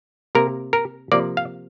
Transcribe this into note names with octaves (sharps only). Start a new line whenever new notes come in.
C3 A#3 A#4
A#4
C3 F3 A#3 D5
F5